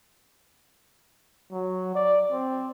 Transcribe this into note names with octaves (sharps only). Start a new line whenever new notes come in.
F#3
D5
C4